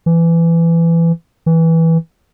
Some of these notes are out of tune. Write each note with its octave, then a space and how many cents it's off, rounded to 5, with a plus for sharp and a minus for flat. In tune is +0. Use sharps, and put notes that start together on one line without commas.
E3 +20
E3 -10